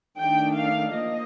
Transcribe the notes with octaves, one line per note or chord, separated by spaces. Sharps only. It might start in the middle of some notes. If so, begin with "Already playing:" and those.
D#3 A3 D4 G5
F5
F3 A#3 D#5